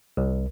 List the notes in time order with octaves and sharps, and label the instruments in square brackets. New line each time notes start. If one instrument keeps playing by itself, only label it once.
[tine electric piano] C2